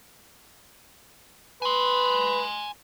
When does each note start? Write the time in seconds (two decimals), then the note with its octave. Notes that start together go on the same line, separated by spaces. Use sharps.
1.62 B4 G#5 C6